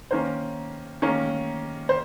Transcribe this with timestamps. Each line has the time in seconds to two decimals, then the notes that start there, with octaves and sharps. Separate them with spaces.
0.11 D#3 A#3 C#4 C5
1.02 D#3 A#3 C#4
1.89 C5